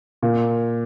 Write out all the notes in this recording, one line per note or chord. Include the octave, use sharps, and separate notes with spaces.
A#2